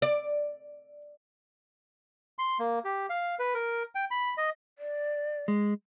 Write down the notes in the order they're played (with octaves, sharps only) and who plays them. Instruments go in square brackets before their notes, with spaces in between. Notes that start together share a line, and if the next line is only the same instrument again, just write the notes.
[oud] D5
[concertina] C6
A#3
G4
F5
B4
A#4
G5
B5
D#5
[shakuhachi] D5
[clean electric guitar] G#3